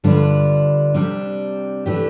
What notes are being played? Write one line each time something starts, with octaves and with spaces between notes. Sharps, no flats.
G2 D3 G3 D4 F4
C3 G3 D4
E3 A3 D4 G4